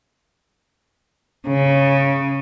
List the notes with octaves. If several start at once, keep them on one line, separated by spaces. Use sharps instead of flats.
C#3